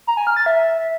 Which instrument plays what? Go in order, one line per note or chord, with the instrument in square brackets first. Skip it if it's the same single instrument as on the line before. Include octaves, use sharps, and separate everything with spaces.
[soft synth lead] A#5
G#5
F6
A6
E5